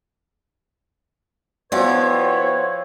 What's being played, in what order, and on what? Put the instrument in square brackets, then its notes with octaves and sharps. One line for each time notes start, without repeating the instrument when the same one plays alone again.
[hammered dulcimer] F3 C4 [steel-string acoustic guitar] B3 F#4 D5 [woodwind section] E4 B4 C#5